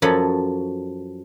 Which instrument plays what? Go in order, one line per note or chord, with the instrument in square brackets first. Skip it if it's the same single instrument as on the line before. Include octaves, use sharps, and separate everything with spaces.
[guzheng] F#2 F3 A4 C#5 D#5 B5